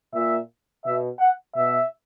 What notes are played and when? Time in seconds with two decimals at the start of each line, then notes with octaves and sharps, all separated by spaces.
0.14 A#2 E5
0.84 B2 E5
1.19 F#5
1.55 B2 E5